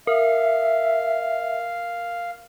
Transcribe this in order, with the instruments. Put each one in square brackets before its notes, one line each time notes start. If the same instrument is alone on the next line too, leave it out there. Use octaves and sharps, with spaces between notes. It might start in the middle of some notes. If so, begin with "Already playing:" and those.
[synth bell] A#4 [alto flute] E5 [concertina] F5